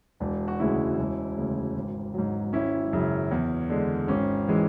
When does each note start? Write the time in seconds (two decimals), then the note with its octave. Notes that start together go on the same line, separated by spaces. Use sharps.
0.20 E1 D4
0.48 F#4
0.59 D2 C#3 G#3 C#4 E4
0.98 E1
1.37 D2 C#3
1.76 G#1
2.14 G#2 F#3
2.53 G#1 C#4 E4
2.93 F#2 C#3
3.31 E2
3.70 D3 G#3
4.08 G#1 C#4
4.48 E3 G#3